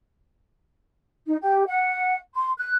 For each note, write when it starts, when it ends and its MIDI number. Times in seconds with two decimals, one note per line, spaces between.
1.27 1.35 63
1.40 1.63 67
1.66 2.14 78
2.34 2.51 84
2.57 2.77 90